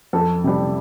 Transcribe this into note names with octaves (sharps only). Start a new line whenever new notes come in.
F2 A4
C3 G3